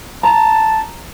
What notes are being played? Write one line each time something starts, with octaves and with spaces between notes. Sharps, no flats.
A5 A#5